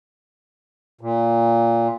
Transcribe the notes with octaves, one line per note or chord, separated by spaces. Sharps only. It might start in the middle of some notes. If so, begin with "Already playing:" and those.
A#2